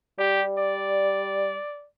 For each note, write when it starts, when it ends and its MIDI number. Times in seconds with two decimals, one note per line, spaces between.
0.19 1.58 55
0.19 0.43 67
0.58 1.87 74